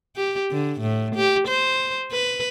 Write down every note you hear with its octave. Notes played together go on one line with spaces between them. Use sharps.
G4
D3
A2
G4
C5
B4